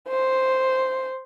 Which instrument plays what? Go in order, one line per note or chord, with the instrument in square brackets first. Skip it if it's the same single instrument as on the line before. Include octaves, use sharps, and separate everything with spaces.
[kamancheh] C5